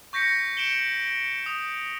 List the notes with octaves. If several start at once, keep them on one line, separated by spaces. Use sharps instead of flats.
C#6 G6 A#6 B6 C#7
D7 E7 F#7 G7
D#6